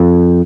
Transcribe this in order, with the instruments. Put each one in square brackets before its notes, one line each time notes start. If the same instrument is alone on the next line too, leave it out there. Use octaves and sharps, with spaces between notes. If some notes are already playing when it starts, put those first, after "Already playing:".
Already playing: [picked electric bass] F2